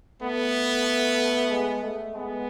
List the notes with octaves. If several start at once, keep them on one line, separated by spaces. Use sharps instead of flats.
A3 B3
G#3
A3
G#3 B3